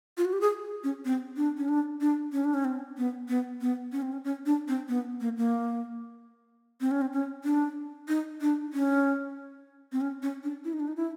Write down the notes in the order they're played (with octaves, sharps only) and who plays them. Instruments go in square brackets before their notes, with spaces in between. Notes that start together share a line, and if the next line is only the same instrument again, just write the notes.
[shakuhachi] F4
F#4
G4
G#4
C#4
C4
D4
C#4
D4
D4
C#4
D4
C#4
C4
B3
B3
B3
C#4
C4
C#4
C#4
D4
C4
B3
A#3
A#3
C4
C#4
C4
C#4
D4
D#4
D4
C#4
C4
C#4
C#4
D4
E4
D#4
D4
D#4
E4